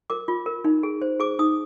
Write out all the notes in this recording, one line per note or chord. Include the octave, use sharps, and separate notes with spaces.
A#4 D6
F4
A#4
D#4
G#4
C5
G#4 D6
D#4 D#6